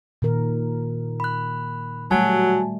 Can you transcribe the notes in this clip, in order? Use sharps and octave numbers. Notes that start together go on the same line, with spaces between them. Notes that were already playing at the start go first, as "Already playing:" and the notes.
A#2 D#3 A#4
B5 F#6
F#3 G3 A3 F#4 G#5 A5